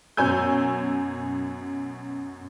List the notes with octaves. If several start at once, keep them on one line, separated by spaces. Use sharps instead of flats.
F#2 B2 C#5 G#5 E6 G6